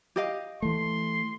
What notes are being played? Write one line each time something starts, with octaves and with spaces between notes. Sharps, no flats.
G4 D#5 F5
E3 A3 C6